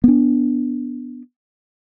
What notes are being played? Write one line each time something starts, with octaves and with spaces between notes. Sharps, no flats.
B3 D4